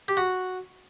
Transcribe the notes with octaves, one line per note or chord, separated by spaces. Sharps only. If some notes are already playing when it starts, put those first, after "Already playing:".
G4
F#4